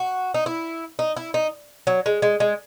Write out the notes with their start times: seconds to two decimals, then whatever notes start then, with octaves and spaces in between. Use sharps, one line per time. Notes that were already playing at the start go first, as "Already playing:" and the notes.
Already playing: F#4
0.34 D#4
0.46 E4
0.99 D#4
1.17 E4
1.34 D#4
1.87 F#3
2.06 G#3
2.22 G#3
2.40 G#3